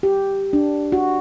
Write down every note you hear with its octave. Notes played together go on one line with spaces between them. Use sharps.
G4
D4
F#4